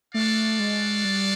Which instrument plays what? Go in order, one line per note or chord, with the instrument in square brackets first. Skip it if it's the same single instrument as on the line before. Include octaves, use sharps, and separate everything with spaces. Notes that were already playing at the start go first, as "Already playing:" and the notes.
[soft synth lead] A3 [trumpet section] D4 F#4 A4 D5 F5
[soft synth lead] G#3
G3